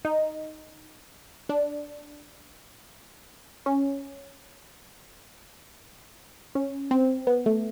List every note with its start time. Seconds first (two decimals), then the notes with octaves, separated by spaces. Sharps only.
0.05 D#4
1.49 D4
3.66 C#4
6.55 C#4
6.91 C4
7.27 B3
7.46 A3